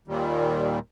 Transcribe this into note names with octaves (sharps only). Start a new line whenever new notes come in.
D#2 A#2 D#3 G3